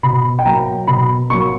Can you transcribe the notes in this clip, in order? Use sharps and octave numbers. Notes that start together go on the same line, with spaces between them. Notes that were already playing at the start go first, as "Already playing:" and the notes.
B2 B5
G5
F#3 A#3 A#5
B2 B5
F#3 A#3 C#6